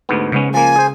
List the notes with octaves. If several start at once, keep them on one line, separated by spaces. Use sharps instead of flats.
D2 G#2 B3
G#2 C#3 G#3 B3 C#4
F3 A#3 G#5
G#4 C5